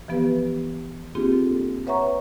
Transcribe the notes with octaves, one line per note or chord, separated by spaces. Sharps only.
E3 F3 B3 G4 B4
A#3 C4 D4 F4 G4 G#4
A4
B4 C#5 E5 F#5 A#5 C#6